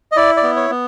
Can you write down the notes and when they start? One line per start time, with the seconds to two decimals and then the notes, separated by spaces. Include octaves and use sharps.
0.12 D#5
0.17 E4 D5
0.37 D5
0.43 B3
0.56 C#5
0.70 B3